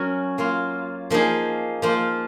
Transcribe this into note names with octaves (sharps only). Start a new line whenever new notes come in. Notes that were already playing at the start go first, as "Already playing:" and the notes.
Already playing: F#3 C#4 F#4 A#4
F#3 A#3 F4
F3 A#3 D#4 G#4
F3 A#3 F4